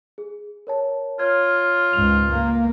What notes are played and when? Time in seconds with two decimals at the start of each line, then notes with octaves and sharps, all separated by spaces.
0.18 G#4
0.67 A#4 C#5 A5
1.19 F4 C#5 F6 G#6
1.93 C#2 G#2 F7
2.30 A#3